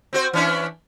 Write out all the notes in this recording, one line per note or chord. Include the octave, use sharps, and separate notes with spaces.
C4 F#4 C5
E3 C#4 D4